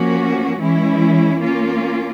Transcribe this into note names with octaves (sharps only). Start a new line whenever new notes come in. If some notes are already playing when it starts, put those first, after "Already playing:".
Already playing: F3 A#3 C#4 F#4
E3 G#3 C#4 E4
A#3 C#4 F4